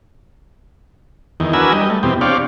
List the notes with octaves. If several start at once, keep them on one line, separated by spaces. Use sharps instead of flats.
E2 D#3
D4 F#4 A#4 B4 G#5 E6
G3 D#5
A3
E2 B2 C4 G4
C4 D4 G4 C#5 D5 F5